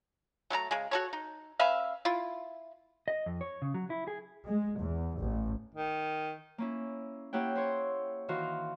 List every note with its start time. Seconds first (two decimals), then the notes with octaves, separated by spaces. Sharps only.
0.50 F#3 A3 A#4 A#5
0.71 C#3 G#3
0.91 F#4 A4 C#5
1.13 D#4
1.59 C#4 B4 E5 F5
2.05 E4 F4
3.08 D#5
3.26 F2
3.41 C#5
3.62 C#3
3.74 F#3
3.90 E4
4.08 G#4
4.47 G#3
4.79 E2
5.19 A1
5.75 D#3
6.58 A#3 C#4 E4
7.33 A#3 E4 G4 C#5 F#5 G5
7.55 E4 C5 C#5
8.28 D#3 E3 F#4 C5 F5